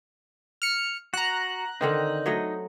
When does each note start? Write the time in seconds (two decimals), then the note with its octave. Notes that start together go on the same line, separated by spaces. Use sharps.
0.62 F6 C#7
1.14 F#4 A#5 F#6
1.81 D3 D#3 C4 D#4
2.26 F#3 A3 D#5